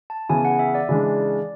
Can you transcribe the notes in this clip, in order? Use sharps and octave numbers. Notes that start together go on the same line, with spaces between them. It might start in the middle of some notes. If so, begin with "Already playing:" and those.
A5
C#3 E3 B3 G#5
F#5
E5
D5
C#3 E3 G#3 D4